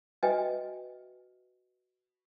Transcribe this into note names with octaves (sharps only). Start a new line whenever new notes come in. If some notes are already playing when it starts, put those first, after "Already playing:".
F#4 B4 D#5 E5 G5 G#5